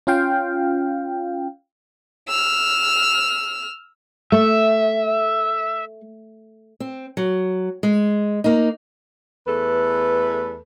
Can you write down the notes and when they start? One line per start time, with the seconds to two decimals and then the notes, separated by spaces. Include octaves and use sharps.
0.07 C#4 F4 F5 G5
2.28 E6 F6
4.32 A3 E5
6.80 C4
7.17 F#3
7.83 G#3
8.44 A#3 D#4
9.47 E2 A3 A4 B4